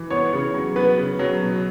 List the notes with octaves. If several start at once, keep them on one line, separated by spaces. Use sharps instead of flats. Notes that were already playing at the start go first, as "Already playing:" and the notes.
Already playing: E3
B3 C#5
C#3
F#3
B3 B4
C#3
F#3
B2